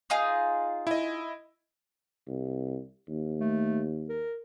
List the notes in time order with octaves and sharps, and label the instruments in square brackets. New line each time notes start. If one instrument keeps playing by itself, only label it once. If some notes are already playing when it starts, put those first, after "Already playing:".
[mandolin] D#4 F4 G#4
[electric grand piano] E4 D#5
[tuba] C2
D#2
[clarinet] A3
A#4